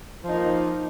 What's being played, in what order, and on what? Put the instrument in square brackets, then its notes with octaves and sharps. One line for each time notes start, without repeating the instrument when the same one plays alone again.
[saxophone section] F3
D#4
A#3